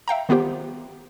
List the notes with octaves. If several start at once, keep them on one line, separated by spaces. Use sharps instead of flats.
E5 F5 G5 A#5
D#3 B3 F4 G4 C5